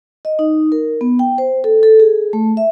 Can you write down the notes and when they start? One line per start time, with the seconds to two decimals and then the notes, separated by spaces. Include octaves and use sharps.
0.25 D#5
0.39 D#4
0.72 A#4
1.01 B3
1.19 G5
1.38 C5
1.64 A4
1.83 A4
2.00 G#4
2.33 A3
2.57 E5